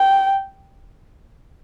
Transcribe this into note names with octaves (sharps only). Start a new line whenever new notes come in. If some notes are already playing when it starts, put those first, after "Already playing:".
Already playing: G5